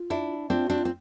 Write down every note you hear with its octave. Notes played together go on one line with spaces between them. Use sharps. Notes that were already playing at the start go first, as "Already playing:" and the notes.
Already playing: F4
D4 E4
C4 D4 F4
C4 D4 F#4
F4
C4